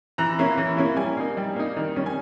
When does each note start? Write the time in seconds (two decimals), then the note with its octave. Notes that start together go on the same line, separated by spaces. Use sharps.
0.18 E3 A#5
0.39 A#3 C#4 E4
0.57 E3
0.77 A#3 C#4 E4
0.97 G3 G#5
1.17 A#3 D#4
1.37 G3
1.56 A#3 D#4
1.77 D#3
1.96 G3 C#4
2.06 G#5